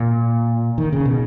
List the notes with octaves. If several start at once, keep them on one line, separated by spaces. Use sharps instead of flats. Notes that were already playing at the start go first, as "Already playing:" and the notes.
Already playing: A#2
D#3
C#3
B2